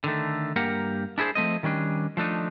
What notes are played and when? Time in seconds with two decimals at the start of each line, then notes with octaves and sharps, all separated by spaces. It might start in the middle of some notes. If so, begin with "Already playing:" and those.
0.04 D3 D#3 A3
0.56 G2 A#3 G4 A#4 F#5
1.18 D4 E4 G4 G#4 C5
1.35 F3 A3 C4 D#5
1.63 D#3 G3 C#4 D4
2.17 F3 A3 D4 D#4